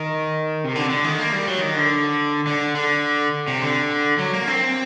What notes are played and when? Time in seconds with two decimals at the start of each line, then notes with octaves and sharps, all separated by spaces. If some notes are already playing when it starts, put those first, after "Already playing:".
Already playing: D#3
0.64 C3
0.75 D3
0.90 D3
1.04 D#3
1.19 A#3
1.32 G3
1.47 F#3
1.61 D#3
1.76 D3
2.47 D3
2.76 D3
3.48 C3
3.61 D3
4.18 F#3
4.33 A#3
4.48 C4